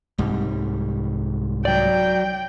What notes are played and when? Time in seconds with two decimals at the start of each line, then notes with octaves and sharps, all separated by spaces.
0.18 C2 G#2 G3
1.65 F#3 D5 G5